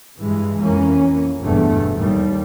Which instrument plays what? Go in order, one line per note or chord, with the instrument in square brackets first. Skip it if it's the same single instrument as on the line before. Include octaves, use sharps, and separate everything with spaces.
[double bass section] G2 E3 G#3
F2 E3 A#3 C#4
G1 E2 G2 B2 A3
D#2 G3